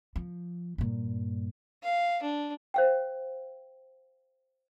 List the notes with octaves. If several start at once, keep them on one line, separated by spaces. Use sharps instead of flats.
F3
G2 A#2
F5
D4
C5 F5 G5